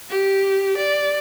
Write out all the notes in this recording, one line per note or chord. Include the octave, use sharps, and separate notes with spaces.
G4
D5